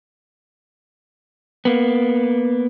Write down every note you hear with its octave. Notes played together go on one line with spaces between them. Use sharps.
A#3 B3